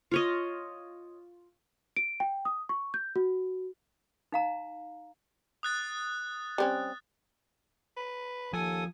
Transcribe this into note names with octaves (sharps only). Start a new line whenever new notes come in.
F4 C#5 D#5
D7
G5
D#6
C#6
G6
F#4
D#4 F5 A#5
D#6 F#6 A6
G3 C4 C#4
B4
D#2 F3 A4 G#5 D#6